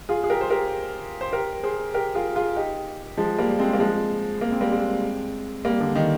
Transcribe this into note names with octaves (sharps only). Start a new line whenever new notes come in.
F4 G#4
G#4
G4 A#4
C5
G4 A#4
C5
G4 A#4
G#4 C5
G4 A#4
F4 G#4
F4 G#4
D#4 G4
F3 G#3
G3 A#3
G#3 C4
A#3
F3 G#3
A#3
C4
G3 A#3
G#3 C4
G3 A#3
D3
D#3